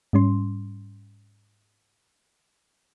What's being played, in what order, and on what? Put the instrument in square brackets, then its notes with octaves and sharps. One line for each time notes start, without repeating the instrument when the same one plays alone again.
[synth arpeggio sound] G#2 G3 C#4 C6